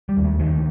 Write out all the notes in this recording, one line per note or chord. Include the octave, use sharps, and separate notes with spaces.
G3
D#2
A3
D2 D#3